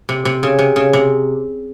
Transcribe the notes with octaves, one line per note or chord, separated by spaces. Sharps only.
C3
C3
C#3
C3
C#3
C3